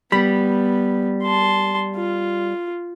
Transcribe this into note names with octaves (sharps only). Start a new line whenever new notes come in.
G3 B3 B5
A5 C6
F4